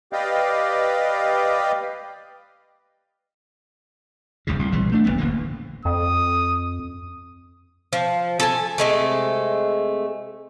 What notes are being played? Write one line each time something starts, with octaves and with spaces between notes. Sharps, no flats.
G4 B4 D5 D#5 F5 G5
F1 C#2 G2 C#3
C2
A#1 E3 G3
A3 D4
D1 A#1 E3 B3
D1 A1 D3 A#3
F2 D#6
F3
A4 G#5
C3 G#3 A3